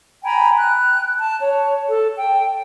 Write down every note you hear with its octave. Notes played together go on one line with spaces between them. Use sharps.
G5 G#5 A#5 B5
F#6
A5
C#5
A4
G5